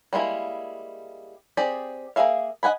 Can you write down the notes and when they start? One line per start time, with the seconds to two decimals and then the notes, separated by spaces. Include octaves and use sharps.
0.13 G3 G#3 A#3 E4 G#4
1.57 C4 G4 G#4 D5
2.16 A#3 C4 G#4 E5 F5
2.63 D#5 F#5 G#5 B5